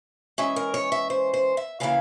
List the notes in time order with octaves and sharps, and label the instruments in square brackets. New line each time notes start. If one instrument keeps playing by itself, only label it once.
[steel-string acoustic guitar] E3 G#3 C#4 E5
A#4
C#5
E5
C5
C5
E5
C#3 E3 A#3 E4 F5